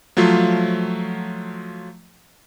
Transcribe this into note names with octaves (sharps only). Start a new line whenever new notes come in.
F3 F#3 A3 F4